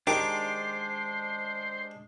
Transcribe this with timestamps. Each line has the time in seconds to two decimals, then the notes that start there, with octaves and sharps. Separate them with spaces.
0.07 D#3 G#3 D4 G4 C5 D6